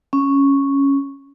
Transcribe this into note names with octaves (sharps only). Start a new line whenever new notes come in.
C#4